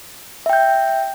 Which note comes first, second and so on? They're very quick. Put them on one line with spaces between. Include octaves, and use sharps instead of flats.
E5 G5 G6